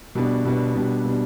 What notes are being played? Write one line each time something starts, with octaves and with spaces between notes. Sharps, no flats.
B2 G3 B3 D4
B2 G3 B3 D4
B2 G3 B3 D4
B2 G3 B3 D4